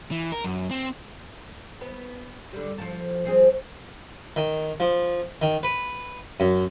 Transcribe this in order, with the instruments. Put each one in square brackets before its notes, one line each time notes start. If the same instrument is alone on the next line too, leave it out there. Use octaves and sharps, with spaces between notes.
[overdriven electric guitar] E3
A#4
F#2
C4
[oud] B3
D3 G3
F3 A4
F3 C4 G#4
[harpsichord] D#3
F3
D#3
B4
F#2